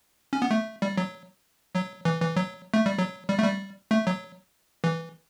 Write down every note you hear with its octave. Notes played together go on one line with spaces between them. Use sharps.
C#4
B3
A3
G3
F#3
F#3
E3
E3
F#3
A3
G3
F#3
G3
A3
G3
A3
F#3
E3